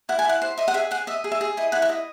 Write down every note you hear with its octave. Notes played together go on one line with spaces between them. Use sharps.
E4 F#5
G#5
E4 F#5
C5
D#5 E5
F#5
G#4 E5
G#4 F#5
D#5 E5
G#4
E5
G#4
E4 D#5
E4 F#5
E5
D#5